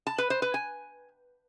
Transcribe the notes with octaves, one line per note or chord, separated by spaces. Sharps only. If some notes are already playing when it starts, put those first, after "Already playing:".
A5
B4
C5
B4
G#5